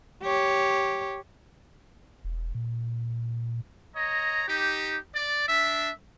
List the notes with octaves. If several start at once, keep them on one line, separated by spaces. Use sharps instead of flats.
G4 C#5
E1
A#2
C#5 D#5 A#5
D#4 G4
D5
D4 E5